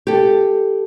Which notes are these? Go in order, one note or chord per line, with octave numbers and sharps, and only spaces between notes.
G4 A4